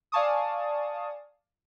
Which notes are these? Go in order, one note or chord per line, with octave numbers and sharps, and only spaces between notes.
D5 F5 G#5 A5 C#6 D#6